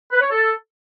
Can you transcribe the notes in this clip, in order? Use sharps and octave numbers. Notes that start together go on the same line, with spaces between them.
B4
C#5
A4